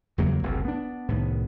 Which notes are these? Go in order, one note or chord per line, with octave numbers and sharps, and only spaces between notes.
E2 C#3 F#3 A#3
F#1 C2 F2
B3 D4
C2 A2 D#3 B3